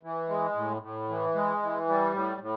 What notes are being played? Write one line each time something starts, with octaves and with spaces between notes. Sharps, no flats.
E3
G#3
A2
A2
E3
G#3
E3
G3
A2
A2